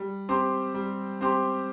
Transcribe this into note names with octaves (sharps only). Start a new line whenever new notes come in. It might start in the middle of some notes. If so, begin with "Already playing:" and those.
Already playing: G3
C4 G4 C5
G3
C4 G4 C5